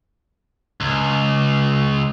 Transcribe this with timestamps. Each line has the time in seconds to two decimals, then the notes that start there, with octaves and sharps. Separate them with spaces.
0.81 C#2